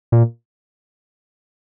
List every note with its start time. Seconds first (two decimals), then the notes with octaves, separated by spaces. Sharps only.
0.12 A#2